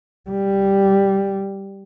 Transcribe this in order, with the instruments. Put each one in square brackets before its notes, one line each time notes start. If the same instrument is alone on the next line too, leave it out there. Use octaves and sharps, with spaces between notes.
[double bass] G3